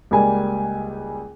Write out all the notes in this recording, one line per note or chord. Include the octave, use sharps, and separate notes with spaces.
C#2 G3 A#3 G#5